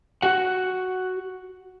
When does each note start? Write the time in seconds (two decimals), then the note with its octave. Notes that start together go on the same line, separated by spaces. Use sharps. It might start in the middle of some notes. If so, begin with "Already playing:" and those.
0.22 F#4 F#5